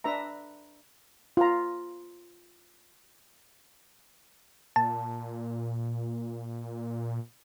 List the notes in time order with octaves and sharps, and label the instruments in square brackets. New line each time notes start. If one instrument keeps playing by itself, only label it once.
[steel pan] D4 B4 E5 A#5
F4 A#5
[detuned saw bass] A#2 [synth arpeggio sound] A5